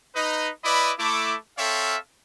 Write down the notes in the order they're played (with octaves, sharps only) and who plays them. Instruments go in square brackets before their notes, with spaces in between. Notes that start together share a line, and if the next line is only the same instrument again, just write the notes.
[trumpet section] D#4 B4 D#5
E4 B4 D5 D#5 B5 D6
A3 E4 D6
C4 A4 C#5 E5 F5